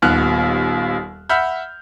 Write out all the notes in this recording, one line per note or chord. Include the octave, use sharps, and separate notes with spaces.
D#1 D#2 B3 F6 F#6
E5 F#5 B5 E6 F6 G6